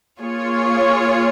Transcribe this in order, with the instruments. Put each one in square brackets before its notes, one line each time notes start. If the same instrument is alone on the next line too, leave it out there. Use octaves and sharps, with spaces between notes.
[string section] A#3 F4 G#4 C#5